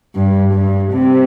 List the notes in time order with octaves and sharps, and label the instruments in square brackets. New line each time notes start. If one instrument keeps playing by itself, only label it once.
[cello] G2
G2
C3